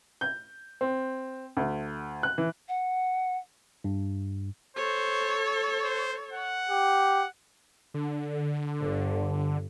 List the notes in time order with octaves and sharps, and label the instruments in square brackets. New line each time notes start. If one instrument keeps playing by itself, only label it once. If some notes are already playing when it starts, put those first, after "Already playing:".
[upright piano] G6
C4
D2
F#6
E3
[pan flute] F#5
[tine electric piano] G2
[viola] A4 C#5 [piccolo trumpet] C5
[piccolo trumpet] C5
F#5
[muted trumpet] G4
[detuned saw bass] D3
[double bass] G1